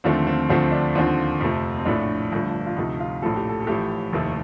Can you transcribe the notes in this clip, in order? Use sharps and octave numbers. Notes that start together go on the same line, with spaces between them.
D#2 D3 F3 A3 C4
C4
D2 D3 F3 A3 C4
D4
D#2 D3 F3 C4
F2 C3 F3 A3
C4
A#1 A2 F3 A3 D4
G1 G2 F3 A3
F4
D2 C3 F3 A3 D#4
F4
A#1 A2 F3 A3 A4
G4
A4
A4
A1 A2 F3 A3 G4
F1 D#2 D#3 A3